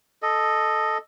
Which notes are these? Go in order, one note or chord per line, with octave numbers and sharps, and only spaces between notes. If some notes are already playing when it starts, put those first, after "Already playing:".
A4 D#5